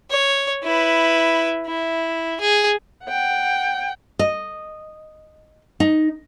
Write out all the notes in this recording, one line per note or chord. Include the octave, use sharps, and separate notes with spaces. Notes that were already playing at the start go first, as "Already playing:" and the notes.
C#5
E4 B4
E4
G#4
F#5 G5
D#5
D#4